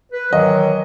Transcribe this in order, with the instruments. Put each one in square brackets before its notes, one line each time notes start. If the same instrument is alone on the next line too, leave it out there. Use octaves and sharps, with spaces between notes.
[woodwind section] B4
[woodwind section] D#3 E3 F#3 [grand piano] D#5